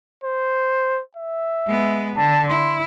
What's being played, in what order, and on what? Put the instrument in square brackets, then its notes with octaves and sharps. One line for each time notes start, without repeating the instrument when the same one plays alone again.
[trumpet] C5
E5
[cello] G#3 B3
[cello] D3 [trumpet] A5
[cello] E4 [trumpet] C6